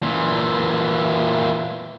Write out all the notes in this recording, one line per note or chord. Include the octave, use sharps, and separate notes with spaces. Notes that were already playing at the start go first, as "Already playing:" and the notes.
A#2 E3